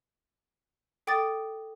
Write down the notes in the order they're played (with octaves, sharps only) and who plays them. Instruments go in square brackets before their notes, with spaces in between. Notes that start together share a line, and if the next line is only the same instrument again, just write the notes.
[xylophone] A4 G5 D6 D#6 A6